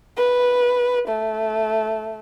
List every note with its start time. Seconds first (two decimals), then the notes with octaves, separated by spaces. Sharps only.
0.17 B4
1.07 A3